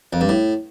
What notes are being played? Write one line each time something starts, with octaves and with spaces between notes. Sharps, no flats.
F2
G2
A2